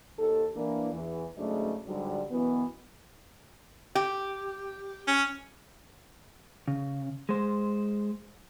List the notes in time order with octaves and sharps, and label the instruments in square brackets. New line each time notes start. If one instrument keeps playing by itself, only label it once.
[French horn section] D#2 A4
E3 A#3 D4
E2 E3
G#2 C#3 F#3 A3 D4 D#5
G#2 D3 F#3 G3
F#2 B2 E3 B3
[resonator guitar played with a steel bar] G4
[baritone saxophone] C#4
[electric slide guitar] C#3
G#3 C5